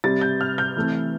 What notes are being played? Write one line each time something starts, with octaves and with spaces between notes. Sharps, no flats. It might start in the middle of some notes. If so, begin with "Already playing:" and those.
C3 G3 C4 A6
G6
F6
G6
E3 A3 C4